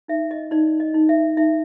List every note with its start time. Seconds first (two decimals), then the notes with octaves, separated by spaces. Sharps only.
0.08 D#4 E5
0.31 D#5
0.51 D#4 D5
0.80 D#5
0.94 D#4
1.09 E5
1.37 D#4 E5